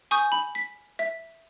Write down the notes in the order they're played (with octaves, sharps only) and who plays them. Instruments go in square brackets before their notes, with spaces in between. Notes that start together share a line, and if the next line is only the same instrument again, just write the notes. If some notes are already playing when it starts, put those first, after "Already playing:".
[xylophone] G#5 C#6 D#6 G6
B5
B6
E5